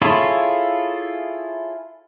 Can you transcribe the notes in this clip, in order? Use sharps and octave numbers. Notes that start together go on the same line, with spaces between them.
E4 F4 G#4 A4 C#5